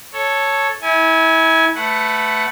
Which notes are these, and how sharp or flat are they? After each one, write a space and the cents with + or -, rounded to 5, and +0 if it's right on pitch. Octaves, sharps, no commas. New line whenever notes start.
A4 +0 C#5 +0
E4 -30 G#5 +5
A3 +0 B4 +10 F#5 +0